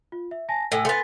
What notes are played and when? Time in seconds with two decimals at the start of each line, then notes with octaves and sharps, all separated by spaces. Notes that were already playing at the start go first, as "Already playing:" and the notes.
0.12 F4
0.31 E5
0.49 G#5 A5 A#6
0.72 A2 A4 G#5 E6
0.85 A3 B3 G#5 C6 A6